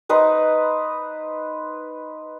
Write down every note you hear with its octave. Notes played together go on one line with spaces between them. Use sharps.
D#4 B4 C5